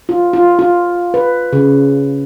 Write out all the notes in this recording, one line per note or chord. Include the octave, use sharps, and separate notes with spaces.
F4
F4
F4
B4
C#3